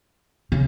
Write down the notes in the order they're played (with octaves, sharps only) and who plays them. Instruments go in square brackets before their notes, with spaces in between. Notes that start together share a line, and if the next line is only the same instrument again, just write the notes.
[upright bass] C#3